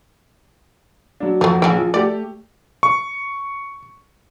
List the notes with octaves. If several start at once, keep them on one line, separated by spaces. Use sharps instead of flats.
F#3 D4
F2 F3 F#3
A#1 C#3 G5
F3
A3 G4 D5
C#6